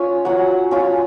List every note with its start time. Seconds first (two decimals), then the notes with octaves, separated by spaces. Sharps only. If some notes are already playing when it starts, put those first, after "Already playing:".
Already playing: C#4 F4 G#5
0.25 F#3 F#5
0.71 C#4 F4